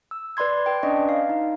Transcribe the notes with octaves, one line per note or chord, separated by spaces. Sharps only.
E6
B4 D5 B5 C6 G#6
B4 G5
C#4 D4 D5 D#5 C#6
F5
D#4